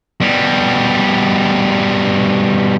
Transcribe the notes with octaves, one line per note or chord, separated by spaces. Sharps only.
B2 G3